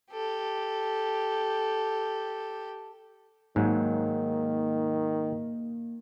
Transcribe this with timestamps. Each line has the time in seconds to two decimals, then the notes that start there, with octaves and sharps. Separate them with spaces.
0.12 G4 A4
3.56 G#2 D#3 F#3 A#3